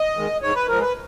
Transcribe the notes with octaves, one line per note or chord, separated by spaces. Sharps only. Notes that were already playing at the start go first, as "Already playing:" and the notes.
Already playing: D#5
D#3 G#3
G#2 C#5
B4
F3 G#3 A#4
B4